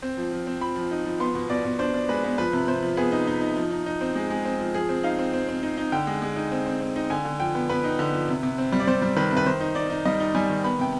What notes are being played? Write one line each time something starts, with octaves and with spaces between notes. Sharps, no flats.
C4
F3
F3
C4
F3 B5
F3
D#4
F3
B3 C6
B2
B2 D5
B2
D4 C5
D4
G#3 B4
B3
F3 B4
C3
C3 C5
F3
B3 G#4
D#4
D#4
D#4
F3
D#4
D#4
C4
G#3
G#3
C4
F3
F3 G#4
C4
D#4 F5
C4
C4
C4
D#4
D#4
D3 G5
G#3
G#3
D#4
C4
C4
C4
D#4
D3 G#5
D3
F3 G5
B3
B3 B4
D#4
D3
F3
C3
C3
C4
G3
D5
G3 C5
G3
D#3 B4
C3
B4
D#3 C5
D#4
D#4 D5
D#4
G3 D#5
D#4
G3 G#5
D#3
B3 B5
C3 G5